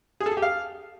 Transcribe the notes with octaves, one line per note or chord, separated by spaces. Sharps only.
G#4
A4
G#4
G4
F5